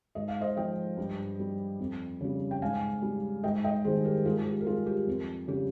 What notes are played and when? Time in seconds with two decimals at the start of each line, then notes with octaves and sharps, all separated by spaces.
0.15 G#2 D#5
0.28 F5
0.41 C5 D#5
0.57 F3 D#5 G5
0.97 G2
1.39 G3
1.79 F2
2.21 C#3 G3
2.51 G5
2.62 G#2 F5 G#5
3.02 G3
3.43 G#2 D#5 G5
3.64 D#5 G5
3.85 D#3 G3 G#4 C5
4.04 G4 A#4
4.25 G#2 F4 G#4
4.46 G4
4.61 A#4
4.66 G3 F4 G#4
4.86 G4
5.07 F2
5.48 C#3 G3 G4